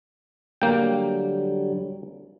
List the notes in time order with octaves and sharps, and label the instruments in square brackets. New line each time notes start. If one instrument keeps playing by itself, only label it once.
[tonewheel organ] D3 F#3 G3 [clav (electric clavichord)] A#3 G5